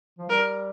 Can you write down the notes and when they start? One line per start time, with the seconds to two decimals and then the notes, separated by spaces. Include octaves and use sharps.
0.19 F3
0.29 G3 A#4